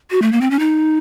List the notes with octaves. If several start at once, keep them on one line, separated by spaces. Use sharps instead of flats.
F#4
A3
A#3
C4
C#4
D#4